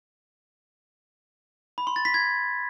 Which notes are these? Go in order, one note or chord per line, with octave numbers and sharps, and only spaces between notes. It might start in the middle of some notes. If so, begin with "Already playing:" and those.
B5
C6
A6
B6
G#6